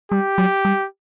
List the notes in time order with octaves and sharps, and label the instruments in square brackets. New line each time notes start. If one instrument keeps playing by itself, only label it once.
[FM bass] G3 [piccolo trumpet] G4
[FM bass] F#3
G3